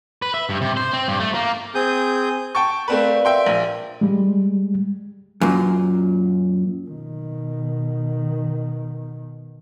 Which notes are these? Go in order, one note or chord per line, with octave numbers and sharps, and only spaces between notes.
B4
E5
G2
C3
C5
C4
G2
A3
A#3
C4 G#4 D#6 G6
G5 A5 C#6
A3 C4 A#4 B4 D5 F5
E5 G5 C6
A#1
G3 G#3
F#2 A#2
B2 D#3